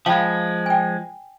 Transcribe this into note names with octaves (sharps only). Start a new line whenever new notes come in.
F3 G#3 F5 G5 B5
G5 G#5